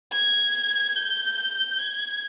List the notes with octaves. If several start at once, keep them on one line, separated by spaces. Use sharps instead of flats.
G#6
G6
G#6